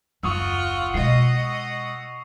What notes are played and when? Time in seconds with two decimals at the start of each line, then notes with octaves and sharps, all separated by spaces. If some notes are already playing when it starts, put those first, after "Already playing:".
0.23 F#1 D#2 F4 F#5 C#6 D#6 E6
0.94 B2 G#3 D#5 F#5 C7